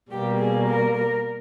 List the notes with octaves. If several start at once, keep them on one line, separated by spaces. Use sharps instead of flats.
B2 G3 A#3 G4
G#4
A#4
A#4